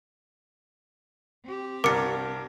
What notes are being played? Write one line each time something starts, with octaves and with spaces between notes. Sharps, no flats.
C4 G4
C2 G2 A#4 D6 C#7